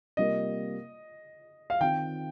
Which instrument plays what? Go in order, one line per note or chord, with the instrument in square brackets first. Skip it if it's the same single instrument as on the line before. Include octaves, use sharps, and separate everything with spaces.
[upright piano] C3 G3 A#3 F4 A#4 [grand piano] D#5
[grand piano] F5
[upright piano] D#3 C4 F4 [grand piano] G5